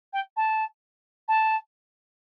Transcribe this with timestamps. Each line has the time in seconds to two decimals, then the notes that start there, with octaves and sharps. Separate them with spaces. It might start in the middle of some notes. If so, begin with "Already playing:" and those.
0.13 G5
0.36 A5
1.28 A5